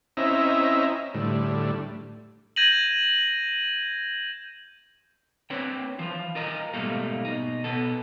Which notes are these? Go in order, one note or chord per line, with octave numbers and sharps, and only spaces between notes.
C4 C#4 E4 D#5 E5 A#5
A2 D3 G3
G6 G#6 A#6 D#7 E7 F#7
C4 D4 B4 C#5 G5
E3 F3 F4
F4 A#4 D#5 A#5
G#2 B2 G3 A3 A#3 F4
B2 D#4
B2 B3 A4